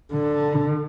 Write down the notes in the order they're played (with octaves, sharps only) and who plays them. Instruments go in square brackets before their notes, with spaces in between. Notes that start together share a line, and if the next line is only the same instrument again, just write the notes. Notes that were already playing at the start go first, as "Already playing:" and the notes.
[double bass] D3